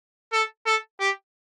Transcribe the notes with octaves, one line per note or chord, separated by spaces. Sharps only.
A4
A4
G4